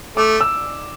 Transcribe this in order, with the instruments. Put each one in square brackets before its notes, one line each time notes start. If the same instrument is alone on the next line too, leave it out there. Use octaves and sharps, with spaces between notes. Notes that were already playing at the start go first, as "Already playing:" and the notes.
[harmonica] A3 [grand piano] D6
[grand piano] E6